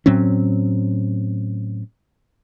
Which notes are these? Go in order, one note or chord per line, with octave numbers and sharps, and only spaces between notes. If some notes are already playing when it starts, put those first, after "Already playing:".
A2 F#3 C4 C#4